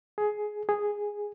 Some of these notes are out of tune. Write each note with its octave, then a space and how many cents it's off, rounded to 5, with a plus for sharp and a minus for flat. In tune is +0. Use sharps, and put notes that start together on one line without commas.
G#4 +15
G#4 -5